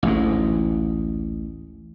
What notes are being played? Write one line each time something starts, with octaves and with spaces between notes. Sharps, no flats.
A1 D2 G#2